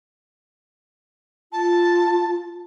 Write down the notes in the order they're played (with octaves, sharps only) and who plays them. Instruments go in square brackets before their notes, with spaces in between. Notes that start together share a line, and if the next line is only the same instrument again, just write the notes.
[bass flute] F4 [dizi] A5